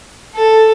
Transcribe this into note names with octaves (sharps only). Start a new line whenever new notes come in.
A4